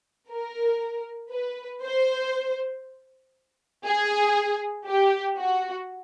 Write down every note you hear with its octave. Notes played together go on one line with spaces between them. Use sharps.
A#4
B4
C5
G#4
G4
F#4